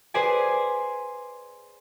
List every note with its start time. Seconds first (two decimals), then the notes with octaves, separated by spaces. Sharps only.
0.14 G#4 B4 C5 D5 G#5